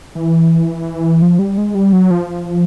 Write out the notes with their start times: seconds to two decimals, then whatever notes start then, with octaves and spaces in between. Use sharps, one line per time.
0.15 E3
1.22 F3
1.39 G3
1.58 G#3
1.75 G3
1.93 F#3
2.11 F3